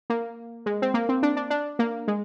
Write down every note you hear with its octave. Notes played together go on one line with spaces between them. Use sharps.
A#3
G#3
C4
A#3
C4
D4
D4
D4
A#3
G#3